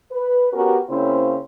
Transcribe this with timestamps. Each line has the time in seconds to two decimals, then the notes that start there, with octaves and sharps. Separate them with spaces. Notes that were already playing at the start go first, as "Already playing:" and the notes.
0.12 B4
0.53 B3 C#4 F#4 G4 A#4
0.89 C#3 A#3 C4 C#4 E4 C5